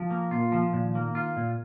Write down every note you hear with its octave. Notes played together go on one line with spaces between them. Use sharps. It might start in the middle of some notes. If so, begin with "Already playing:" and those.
Already playing: F3
A#3
A#2 F4
F3
A#2 D#3
A#3
F4
A#2